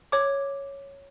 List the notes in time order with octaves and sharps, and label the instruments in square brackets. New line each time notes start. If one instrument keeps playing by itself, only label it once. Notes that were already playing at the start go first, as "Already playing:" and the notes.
[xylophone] C#5 D6